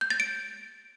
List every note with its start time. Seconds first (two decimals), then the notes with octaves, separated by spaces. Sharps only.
0.01 G6
0.10 A6
0.20 D7